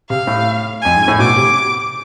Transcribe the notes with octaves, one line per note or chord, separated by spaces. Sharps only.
C3 F5
A2
F2 G#5
G#2
A2
B2 D6
C3